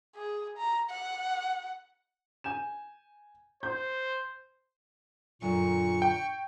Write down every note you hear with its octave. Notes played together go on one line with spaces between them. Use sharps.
G#4
A#5
F#5
G#5 G6 E7
C5 G6
F#2 A#2 D3 C#6
G5